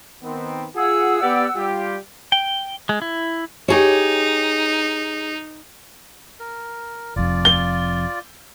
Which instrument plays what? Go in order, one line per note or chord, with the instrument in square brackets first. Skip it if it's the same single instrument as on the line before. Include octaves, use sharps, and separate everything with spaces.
[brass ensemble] D#3 B3 C4
[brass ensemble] F4 G#4 [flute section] F#5 E6
[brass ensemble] B3 G4 D5
G3 F4 G4
[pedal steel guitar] G5
G#3
E4
[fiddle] D#4 [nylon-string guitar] G4 G#4 C#5
[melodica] A#4
[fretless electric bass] F1 F2 [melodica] F4 D5
[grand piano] G7